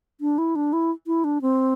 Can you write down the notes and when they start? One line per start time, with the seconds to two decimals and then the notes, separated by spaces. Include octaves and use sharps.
0.21 D4
0.38 E4
0.56 D4
0.73 E4
1.07 E4
1.24 D4
1.42 C4